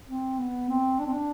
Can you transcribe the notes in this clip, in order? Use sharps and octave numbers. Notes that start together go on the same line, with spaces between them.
C4
B3
C4
D4
C4
D4